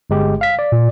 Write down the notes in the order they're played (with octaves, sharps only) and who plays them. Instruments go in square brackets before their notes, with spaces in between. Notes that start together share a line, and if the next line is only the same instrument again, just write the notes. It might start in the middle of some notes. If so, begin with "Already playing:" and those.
[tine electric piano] G1 G#3 G4
F5 B6
D5
[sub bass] A#2